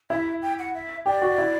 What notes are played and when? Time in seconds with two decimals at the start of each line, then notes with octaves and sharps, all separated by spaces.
0.10 E4 E5
0.42 G5
0.59 F#5
0.74 E5
1.06 G4 D5
1.22 F#4
1.38 E4